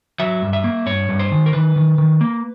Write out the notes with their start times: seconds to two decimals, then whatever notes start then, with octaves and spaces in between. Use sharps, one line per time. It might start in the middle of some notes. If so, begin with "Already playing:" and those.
0.20 F#3 E5
0.42 G2
0.53 E5
0.64 A#3
0.86 G2 C#5
1.09 G2
1.19 C5
1.32 D#3
1.46 A#4
1.53 D#3 B4
1.76 D#3
1.98 D#3
2.21 A#3